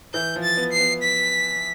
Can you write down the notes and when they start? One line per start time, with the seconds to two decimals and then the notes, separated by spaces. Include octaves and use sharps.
0.14 E3 G6
0.36 F3
0.43 A6
0.57 B3
0.72 C7
0.80 B3
1.03 B6